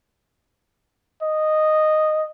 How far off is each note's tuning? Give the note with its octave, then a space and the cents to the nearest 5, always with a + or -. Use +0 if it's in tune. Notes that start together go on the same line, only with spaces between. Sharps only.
D#5 -5